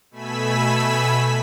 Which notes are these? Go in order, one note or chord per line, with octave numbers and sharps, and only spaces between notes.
B2 A3 G#5 B5 E6 B6